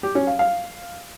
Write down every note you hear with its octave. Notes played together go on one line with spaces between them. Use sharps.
G4
C#4
F5
F5